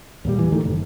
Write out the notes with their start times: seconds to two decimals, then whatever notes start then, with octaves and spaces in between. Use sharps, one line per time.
0.25 D#2 A#2 G3
0.39 E3
0.52 D1 D#3 A3
0.64 F#1